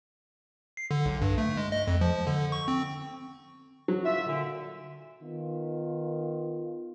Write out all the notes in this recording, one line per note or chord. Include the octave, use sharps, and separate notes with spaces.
C7
D3
B1
G2
A3
G#3
D#5
F2
F3
D3
C#6
C4
F#3
F4 E5
A#2 D3
D#3 B3 F4